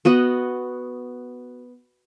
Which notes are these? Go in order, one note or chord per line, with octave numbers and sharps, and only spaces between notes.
B3 F#4 D#5 F#5